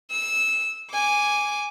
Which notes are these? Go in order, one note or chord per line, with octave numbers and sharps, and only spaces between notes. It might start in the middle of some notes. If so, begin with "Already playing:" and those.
E6
G#5 D6